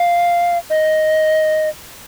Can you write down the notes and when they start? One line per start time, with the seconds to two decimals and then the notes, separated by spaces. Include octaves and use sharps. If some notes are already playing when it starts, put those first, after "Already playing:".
Already playing: F5
0.70 D#5